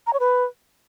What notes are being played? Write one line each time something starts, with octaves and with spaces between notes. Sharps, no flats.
A#5
C#5
B4